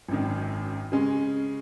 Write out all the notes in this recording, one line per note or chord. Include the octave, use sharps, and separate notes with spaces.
G#1 F#2 D#3
C#3 G#3 C#4